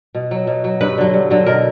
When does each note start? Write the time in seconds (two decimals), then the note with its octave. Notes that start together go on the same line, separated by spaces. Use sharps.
0.15 B2
0.31 F#3
0.47 B2
0.64 F#3
0.80 G2 B4
0.98 D3 F#3
1.14 G2
1.30 D3 F#3
1.46 B2 A#4